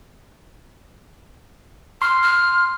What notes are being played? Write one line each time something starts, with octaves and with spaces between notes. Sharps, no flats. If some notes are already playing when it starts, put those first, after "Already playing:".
C6 F6
F6